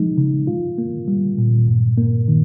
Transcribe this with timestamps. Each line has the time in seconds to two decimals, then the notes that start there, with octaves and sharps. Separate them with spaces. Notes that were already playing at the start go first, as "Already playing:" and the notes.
Already playing: F3 G#3 D#4
0.18 C#3
0.47 F4
0.78 A#3
1.08 G3
1.38 A#2
1.68 G2
1.97 A#3
2.28 D#3